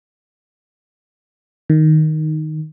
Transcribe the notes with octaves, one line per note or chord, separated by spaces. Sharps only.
D#3